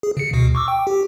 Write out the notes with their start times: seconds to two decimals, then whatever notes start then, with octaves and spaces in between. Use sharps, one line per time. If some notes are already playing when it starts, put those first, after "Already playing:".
0.03 G#4
0.17 C#3 C#7
0.33 D2 B2
0.55 C#6 D6 E6
0.68 G5
0.87 G4